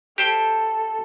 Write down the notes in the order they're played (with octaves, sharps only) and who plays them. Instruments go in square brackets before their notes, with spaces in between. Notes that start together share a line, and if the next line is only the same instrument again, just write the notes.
[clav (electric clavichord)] G4 C5 G5 [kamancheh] A4